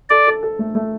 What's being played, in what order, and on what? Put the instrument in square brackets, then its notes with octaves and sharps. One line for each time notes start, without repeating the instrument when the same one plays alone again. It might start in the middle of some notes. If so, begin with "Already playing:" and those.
[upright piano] A4 [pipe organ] D5
[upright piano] A4
A4
A3
A3